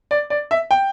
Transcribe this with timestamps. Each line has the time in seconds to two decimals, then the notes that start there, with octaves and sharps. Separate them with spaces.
0.11 D5
0.30 D5
0.51 E5
0.71 G5